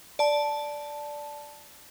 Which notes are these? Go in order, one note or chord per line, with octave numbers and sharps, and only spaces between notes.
D5 A5